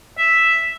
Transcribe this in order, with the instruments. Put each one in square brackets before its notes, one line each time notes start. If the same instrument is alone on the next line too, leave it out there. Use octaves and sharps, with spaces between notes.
[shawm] E5